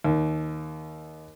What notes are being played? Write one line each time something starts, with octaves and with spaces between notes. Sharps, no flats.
D#2